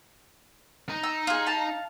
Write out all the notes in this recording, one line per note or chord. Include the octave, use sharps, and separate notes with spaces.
D#4
E6
F4 G#4
F5 A5